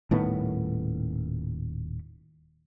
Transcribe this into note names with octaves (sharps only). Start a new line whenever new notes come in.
D#1 A2 D#3 B3